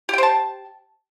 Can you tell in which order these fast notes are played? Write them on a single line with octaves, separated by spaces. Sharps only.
G4 G5 C5 A5